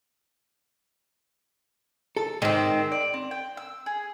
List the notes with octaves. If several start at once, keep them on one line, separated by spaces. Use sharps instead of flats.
A4
G#2 D#3 C4
D5
C4
G5
E6
G#4